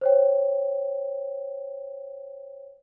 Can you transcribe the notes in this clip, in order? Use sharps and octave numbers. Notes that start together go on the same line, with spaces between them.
C5 C#5 G5